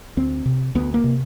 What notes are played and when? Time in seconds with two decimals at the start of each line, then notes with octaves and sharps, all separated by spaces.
0.17 D2 C4
0.46 C3
0.75 D2 B3
0.94 A#3
1.04 C3